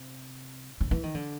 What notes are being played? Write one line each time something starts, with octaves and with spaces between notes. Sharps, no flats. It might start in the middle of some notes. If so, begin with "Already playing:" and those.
Already playing: C3
C#3
E3
D#3
D3